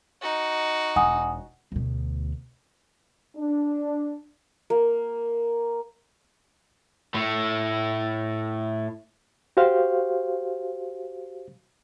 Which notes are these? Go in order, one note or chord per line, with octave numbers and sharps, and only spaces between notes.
D#4 F#4
E1 F#5 G#5 D#6
D2 B2
D4
A#3
A2 A3
F#4 G4 C5 F5